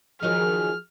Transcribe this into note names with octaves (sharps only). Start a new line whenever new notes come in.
D#3 F3 F#3 D#4 G#4 F6